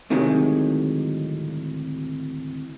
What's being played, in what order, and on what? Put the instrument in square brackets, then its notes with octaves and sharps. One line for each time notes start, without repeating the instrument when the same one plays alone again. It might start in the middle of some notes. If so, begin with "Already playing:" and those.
[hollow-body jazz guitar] D2 A2 C3 D#3 F#3 G#3